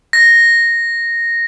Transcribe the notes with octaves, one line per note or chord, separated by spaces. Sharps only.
A#6